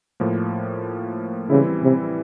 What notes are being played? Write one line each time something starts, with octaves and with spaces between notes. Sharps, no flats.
A2 F3 A#3
C#3 E3 G3 C4 E4
C3